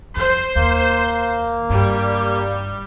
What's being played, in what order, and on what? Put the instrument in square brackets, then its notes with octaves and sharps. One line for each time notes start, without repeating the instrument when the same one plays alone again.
[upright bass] F2 [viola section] C5
[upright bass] D#2 [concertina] A#3
[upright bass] G2 [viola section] G3